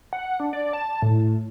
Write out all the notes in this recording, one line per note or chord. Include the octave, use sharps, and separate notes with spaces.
F#5
D4
D5
A5
A2